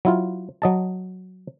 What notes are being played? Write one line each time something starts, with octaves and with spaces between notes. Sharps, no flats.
F#3 E4 F4
F#3 D#5 A5